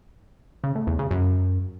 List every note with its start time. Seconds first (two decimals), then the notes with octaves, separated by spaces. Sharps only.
0.64 C#3
0.75 A2
0.87 E2
0.99 C#3
1.11 F#2